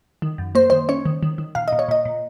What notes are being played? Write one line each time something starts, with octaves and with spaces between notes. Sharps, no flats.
D#3
F#2
A#3 C5
D#3 C5
C#4 C#5
D#3
D#3
D#3
A#2 F5
A#2 D#5
C#5
A#2 D#5
A#2